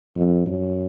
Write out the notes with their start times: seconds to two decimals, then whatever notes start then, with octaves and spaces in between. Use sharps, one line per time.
0.16 F2
0.46 F#2